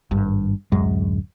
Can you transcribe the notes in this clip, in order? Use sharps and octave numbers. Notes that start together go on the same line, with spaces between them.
G#1 G2
D1 F#2 G#3